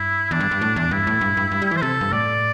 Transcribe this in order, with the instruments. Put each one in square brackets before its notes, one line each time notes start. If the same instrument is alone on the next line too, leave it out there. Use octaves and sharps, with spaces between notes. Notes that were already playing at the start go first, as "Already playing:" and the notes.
Already playing: [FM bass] G2 [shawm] E4
[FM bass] E2 [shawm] D4
[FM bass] G2
G2
A2
E2
[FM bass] G2 [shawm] E4
[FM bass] A2
G2
G2
G2
G3
E3
[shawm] C5
[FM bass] C3 [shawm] A4
[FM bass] G2
[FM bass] A2 [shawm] D5